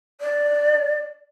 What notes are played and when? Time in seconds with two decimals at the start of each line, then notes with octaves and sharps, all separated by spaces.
0.21 D5